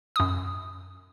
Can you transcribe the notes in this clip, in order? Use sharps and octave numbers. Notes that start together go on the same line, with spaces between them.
F#2 D#6